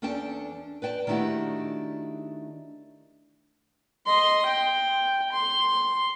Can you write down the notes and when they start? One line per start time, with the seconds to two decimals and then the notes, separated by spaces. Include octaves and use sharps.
0.02 E2 C#4 D4 A4 G5 A5
0.82 B4 D5 G5 A5
1.07 D#3 A3 D4 E4 F#4 G4
4.06 D#5 C6
4.46 G5
5.32 C6